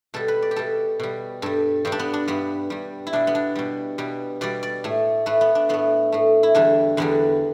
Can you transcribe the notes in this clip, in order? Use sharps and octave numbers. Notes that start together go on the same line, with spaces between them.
B2 G3 A4
B4
D5
G4
B2 G3 A4
B2 G3
G2 G3 A4
G2 G3 G4
D4
B3
D4
G2 G3 B3
G2 G3
E4
B2 G3 D4
B3
D4
B2 G3
B2 G3
B2 G3 D5
D5
A2 A3
A2 A3 B4
B3
D4
A2 A3 B3
A2 A3
E4
E2 D3 G3 D4
E2 D3 G3 B3